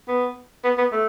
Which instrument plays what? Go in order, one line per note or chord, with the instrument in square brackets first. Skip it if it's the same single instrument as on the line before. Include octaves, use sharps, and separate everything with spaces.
[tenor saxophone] B3
B3
B3
A3